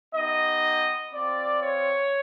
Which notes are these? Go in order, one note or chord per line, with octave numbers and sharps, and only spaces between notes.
B3 D#4 G4 D#5
C4 F4 D5
C#5